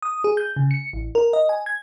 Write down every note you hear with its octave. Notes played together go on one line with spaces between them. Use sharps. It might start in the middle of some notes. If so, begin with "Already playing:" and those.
D#6
G#4
G6
C#3
C#7
A1
A#4
D#5
G#5
G#6